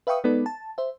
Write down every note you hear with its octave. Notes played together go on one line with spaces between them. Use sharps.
B4 E5 F5 G5 C#6 D#6
G#3 B3 D#4 A4 B4 D5
A5
C5 E5